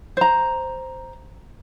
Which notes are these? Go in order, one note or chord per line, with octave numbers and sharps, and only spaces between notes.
C5 A#5